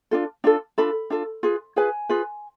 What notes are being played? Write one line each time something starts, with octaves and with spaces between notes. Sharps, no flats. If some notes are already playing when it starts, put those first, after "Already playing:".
D4 F4 A4
D4 F4 A4
D4 F4 A4 B5
D4 F4 A4
F4 G#4 B4
F4 G#4 B4 G#5
F4 G#4 B4